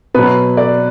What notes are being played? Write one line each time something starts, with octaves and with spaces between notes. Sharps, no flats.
B2 F#3 B4
D5